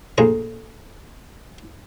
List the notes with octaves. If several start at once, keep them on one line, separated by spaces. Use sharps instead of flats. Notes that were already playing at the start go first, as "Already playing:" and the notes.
A#1 A2 G#4 A#5